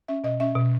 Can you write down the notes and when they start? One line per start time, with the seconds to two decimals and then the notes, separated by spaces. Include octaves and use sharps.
0.08 C#4 E5
0.24 B2 D#5
0.40 C#4 E5
0.55 B2